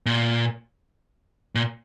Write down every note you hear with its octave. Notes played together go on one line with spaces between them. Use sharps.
A#2
A#2